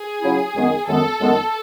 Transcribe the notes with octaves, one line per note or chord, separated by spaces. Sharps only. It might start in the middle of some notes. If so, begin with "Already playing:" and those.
Already playing: G#4
C#3 F#3 C#4 E4
F#2 D#3 G#3 B3
F#2 D#3 G#3 B3 A4
F#2 D#3 G#3 B3